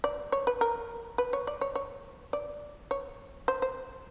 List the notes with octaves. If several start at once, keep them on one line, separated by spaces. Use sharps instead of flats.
D5
C#5
B4
A#4
B4
C#5
D5
C#5
C#5
D5
C#5
C5
C5